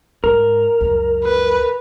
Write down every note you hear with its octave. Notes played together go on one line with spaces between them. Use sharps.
G#2 A#4
C#2 F#2
B4